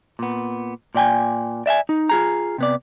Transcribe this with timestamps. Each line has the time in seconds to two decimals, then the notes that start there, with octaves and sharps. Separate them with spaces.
0.19 A#2 B3
0.95 A#2 D5 G5 G#5
1.66 D5 E5 F#5 G#5
1.89 D#4
2.10 F4 G#4 A#5
2.58 C3 B3 D5